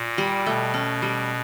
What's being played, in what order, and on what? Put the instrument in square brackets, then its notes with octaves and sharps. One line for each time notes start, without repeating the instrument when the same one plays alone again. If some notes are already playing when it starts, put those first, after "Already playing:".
Already playing: [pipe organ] A#2
[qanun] G3
[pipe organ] B2 [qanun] A3
[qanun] C#4
G3